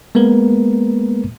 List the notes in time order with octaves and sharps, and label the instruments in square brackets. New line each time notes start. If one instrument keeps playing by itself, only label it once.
[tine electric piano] G#3 A#3 B3 A#4 B4